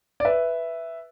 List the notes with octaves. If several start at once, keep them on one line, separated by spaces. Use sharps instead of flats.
D5
B4 E5